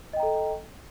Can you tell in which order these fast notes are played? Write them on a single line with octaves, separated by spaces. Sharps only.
D#5 G5 A#5 A4